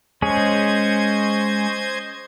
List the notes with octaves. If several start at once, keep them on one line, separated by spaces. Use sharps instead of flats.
G#3 C#4 G#4 C5 D#5 G#6